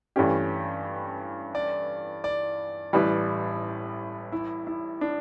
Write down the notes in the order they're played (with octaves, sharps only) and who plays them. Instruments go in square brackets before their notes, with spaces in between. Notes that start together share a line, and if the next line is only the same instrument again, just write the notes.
[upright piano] G2 E3 A3 C#4 G4
[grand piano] D5
D5
[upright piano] A1 A2 G3 [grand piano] B4
[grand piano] E4
E4
D4